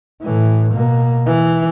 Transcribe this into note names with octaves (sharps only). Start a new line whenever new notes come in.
A2 E3
B2 A#3
E3